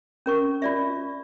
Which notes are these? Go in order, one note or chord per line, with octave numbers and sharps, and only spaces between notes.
C#4 A#4 C#6
F4 D5 E5